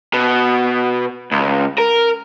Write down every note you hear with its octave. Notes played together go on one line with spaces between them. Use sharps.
B2
C#2
A#4